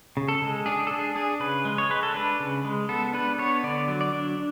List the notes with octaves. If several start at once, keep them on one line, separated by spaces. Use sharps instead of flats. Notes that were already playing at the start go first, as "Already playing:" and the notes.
C#3
A4
G#3
D4 G#4
A4
D4 G#4
D4 G#4
C#3 B4
G#3
C#5
G#3 B4
A4
D4 B4
C#3
G#3
B3 A4
D4 B4
B3 C#5
D3 D5
F#3
D5
D4